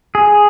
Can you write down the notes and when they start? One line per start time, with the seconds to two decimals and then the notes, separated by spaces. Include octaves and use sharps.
0.15 G#4